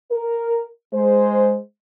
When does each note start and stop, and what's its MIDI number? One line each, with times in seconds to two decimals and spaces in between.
0.12 0.64 70
0.94 1.57 56
0.94 1.57 72